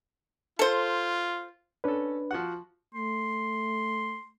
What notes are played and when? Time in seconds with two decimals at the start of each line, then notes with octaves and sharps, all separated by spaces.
0.59 F4 A4 C5
1.84 C#4 D4 A4 B4
2.31 F3 F#4 F#5
2.95 A3 C6